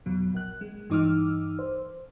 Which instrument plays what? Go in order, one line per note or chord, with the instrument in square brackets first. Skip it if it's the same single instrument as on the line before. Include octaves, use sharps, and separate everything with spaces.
[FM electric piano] F2 B2 F#3
A#1 F#6
G#3
G2 E3 D#4 D6 E6 F6
C5